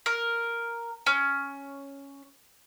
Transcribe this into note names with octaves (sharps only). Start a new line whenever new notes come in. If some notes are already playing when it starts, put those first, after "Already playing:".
A#4
C#4